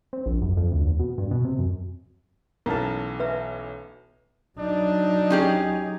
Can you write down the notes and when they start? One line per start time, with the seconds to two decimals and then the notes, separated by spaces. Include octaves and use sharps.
0.13 C4
0.26 A#1
0.42 F#2
0.57 F2
0.71 D2
0.86 E2
0.99 B2
1.18 G2
1.31 B2
1.44 C3
1.59 F#2
2.66 B1 E3 C#4 A#4 A5
3.20 B4 E5 A#5
4.59 F#3 D4 D#4
5.30 C#4 G4 G#4